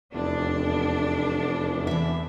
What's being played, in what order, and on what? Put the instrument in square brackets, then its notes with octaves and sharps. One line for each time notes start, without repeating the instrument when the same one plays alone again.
[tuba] F1 [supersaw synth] E2 [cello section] D4
[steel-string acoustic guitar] E3 E5